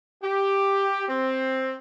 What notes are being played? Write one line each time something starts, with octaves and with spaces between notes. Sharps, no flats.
G4
C4